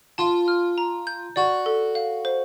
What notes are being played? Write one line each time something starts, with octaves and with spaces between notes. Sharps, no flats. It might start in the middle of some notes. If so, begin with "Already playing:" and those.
F4 A5
F6
A#5
G6
F#4 D5
A4
F5
C5